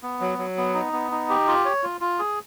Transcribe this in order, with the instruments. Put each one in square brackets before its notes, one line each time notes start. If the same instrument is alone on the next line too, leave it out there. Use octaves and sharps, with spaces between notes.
[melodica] B3
F#3
F#3
B3
D#4
B3
D#4
G4
F4
C#5
F4
F4
G#4